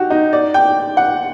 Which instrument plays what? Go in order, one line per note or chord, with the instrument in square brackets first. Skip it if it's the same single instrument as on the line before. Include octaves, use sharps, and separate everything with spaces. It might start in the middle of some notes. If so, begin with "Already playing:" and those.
Already playing: [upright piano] D#4 F#4 G4
D#4
D5
G5
F#5